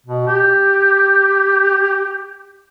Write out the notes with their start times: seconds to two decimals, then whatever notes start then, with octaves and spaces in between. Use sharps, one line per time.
0.06 B2
0.27 G4